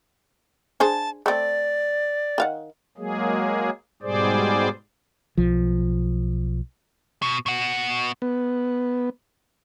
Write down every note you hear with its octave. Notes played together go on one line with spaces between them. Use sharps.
D4 G#4 C5 A5
A3 C4 D5
D#3 F5 F#5
F#3 G#3 A#3 G#4
G#2 B2 G3 G#4 C5 D5
B1 F3
B2
B2 F#5
B3